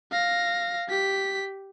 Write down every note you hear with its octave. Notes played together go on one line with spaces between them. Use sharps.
F5 A#6
G4 B6